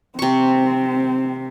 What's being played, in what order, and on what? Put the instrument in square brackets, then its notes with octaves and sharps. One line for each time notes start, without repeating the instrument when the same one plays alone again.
[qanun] C3 C#6 [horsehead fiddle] C4